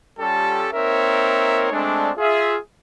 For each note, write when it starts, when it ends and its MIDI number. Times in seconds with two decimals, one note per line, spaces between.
0.20 0.68 55
0.20 0.68 61
0.20 0.68 65
0.20 0.68 67
0.20 0.68 69
0.73 1.67 58
0.73 1.67 60
0.73 1.67 63
0.73 1.67 70
0.73 1.67 73
0.73 1.67 76
1.71 2.11 56
1.71 2.11 57
1.71 2.11 60
1.71 2.11 62
2.18 2.57 65
2.18 2.57 68
2.18 2.57 76